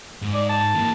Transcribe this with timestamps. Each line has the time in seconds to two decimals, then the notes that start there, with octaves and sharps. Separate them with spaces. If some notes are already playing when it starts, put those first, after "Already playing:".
0.22 G#2
0.34 D5
0.50 A5
0.75 E3 A#3